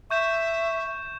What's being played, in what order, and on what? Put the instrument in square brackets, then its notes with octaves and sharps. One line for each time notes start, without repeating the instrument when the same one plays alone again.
[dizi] E5 [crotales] C#6 G6 E7